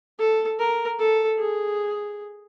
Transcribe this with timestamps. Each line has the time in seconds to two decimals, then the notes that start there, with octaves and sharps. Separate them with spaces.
0.19 A4
0.59 A#4
0.99 A4
1.38 G#4